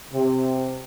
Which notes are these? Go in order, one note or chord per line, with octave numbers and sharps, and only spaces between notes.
C3